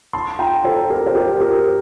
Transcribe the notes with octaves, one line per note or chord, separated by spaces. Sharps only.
A5 C6
G5 A#5
A4 C5
G4 A#4
C5
G4 A#4
G4 A#4